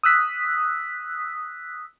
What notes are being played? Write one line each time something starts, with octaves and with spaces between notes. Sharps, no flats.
D#6 E6 F#6 B6